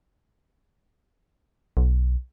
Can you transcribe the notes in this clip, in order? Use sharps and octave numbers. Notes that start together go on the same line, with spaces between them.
B1